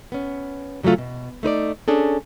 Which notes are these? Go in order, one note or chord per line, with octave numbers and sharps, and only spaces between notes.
B3 C#4
C#3 F#3 G3 A3 F4
B2
A3 D#4 B4 D5
C#4 D4 G#4 A4